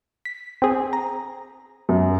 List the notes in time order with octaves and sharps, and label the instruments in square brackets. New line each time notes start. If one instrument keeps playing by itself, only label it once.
[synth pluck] B6
C4 G#4
A#5
[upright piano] F#2